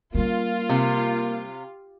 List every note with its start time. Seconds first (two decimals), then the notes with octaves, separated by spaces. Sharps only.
0.15 G3 A#3 C#4 F4
0.69 C3